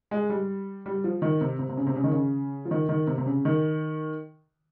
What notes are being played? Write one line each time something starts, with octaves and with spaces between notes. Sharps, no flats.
G#3
G3
G3
F3
D#3
C3
C3
C3
C#3
C3
C#3
D#3
C#3
F3
D#3
D#3
C3
C3
C#3
D#3